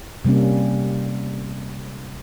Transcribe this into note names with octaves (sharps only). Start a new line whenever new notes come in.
C3 G3 A#3 C#4